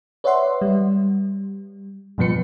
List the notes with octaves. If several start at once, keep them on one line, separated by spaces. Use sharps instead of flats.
B4 C#5 D5 E5 F#5 C6
G3
G2 B2 F3 B3 B4 C#7